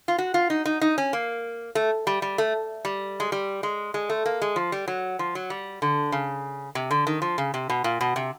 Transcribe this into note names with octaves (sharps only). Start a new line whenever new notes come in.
F4
F#4
F4
D#4
D#4
D#4
C#4
A#3
A3
G3
G3
A3
G3
G#3
G3
G#3
G#3
A3
A#3
G#3
F3
G3
F#3
F3
F#3
G3
D3
C#3
C3
D3
D#3
F3
C#3
C3
B2
A#2
B2
C3